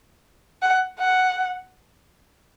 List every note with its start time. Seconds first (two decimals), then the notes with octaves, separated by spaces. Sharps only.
0.62 F#5
0.99 F#5